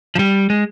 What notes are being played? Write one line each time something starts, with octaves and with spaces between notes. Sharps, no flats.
F3
G3
G#3